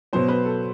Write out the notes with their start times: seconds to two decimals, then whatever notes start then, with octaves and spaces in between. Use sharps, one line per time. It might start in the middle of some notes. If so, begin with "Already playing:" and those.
0.13 B2 F#3 B3 C5
0.28 B4
0.45 A4